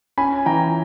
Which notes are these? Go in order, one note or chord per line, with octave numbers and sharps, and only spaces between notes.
C#4 G#5 B5
E3 G5 A#5